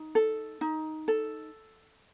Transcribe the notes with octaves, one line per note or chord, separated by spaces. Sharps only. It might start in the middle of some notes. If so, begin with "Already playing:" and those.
Already playing: D#4
A4
D#4
A4